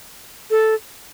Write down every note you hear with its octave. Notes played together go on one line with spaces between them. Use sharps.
A4